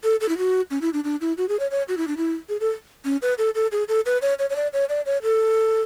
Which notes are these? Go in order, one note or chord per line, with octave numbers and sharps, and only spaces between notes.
A4
A4
E4
F#4
C#4
E4
D4
D4
E4
F#4
G#4
C#5
C#5
F#4
E4
D4
E4
G#4
A4
C#4
B4
A4
A4
G#4
A4
B4
C#5
C#5
C#5
D5
C#5
D5
C#5
A4